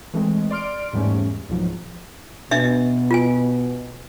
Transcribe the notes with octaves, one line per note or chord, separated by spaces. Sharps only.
E3 G#3 A3 C4
D5 C6 F6 D7
E2 G#2 G3 A3 C#4
C2 G#2 B2 F3 F#3
B2 D4 D#5 E5
F4 G#5